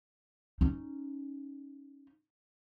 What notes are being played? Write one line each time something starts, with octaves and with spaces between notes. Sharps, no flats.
C#4 D#4